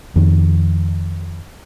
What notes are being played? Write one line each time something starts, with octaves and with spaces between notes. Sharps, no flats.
F2 D#3